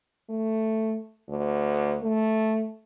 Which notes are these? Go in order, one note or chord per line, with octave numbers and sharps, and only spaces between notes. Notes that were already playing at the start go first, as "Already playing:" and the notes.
A3
D2
A3